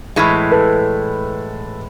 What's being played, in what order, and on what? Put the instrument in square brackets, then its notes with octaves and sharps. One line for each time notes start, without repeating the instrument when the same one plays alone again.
[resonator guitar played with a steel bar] A2 E3 G#3
[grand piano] A4 B4